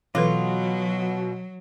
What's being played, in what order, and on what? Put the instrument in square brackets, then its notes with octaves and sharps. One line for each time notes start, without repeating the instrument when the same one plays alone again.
[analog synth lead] B2 [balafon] E3 A4 B4 [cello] F#3 [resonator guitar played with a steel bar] F4